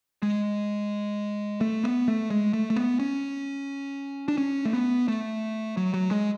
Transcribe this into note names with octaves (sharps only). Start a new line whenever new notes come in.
G#3
A3
B3
A3
G#3
A3
A3
B3
C#4
D4
C#4
A3
B3
A3
F#3
F#3
G#3